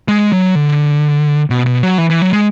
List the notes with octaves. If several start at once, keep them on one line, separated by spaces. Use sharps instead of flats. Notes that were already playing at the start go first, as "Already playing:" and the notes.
G#3
F#3
D3
B2
B2
F#3
E3
E3
F#3
G#3